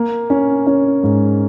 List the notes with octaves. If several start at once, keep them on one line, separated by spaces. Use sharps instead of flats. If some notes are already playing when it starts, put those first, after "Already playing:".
Already playing: A#3
C#4
C#4
G#2